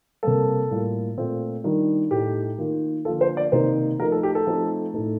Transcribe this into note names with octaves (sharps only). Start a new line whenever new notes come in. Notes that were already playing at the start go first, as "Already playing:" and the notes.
C3 G3 A#3 A4
A2 G3 A#3 F4
A#2 A3 C4 F4
D#3 G3 D4 F4
A2 A3 D#4 G4
D#3 A#3 F4
D3 F3 A#3 F4 A4
C5
D5
C3 D#3 A#3 D#4 C5
F3 A3 D#4 A#4
A4
G4
A4
F3 A3 C4 D#4
A2 A3 D#4